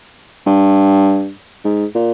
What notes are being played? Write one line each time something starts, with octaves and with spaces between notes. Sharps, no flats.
G2
G#2
A#2